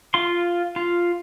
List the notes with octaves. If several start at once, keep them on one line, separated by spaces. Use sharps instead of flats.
F4 C6
F4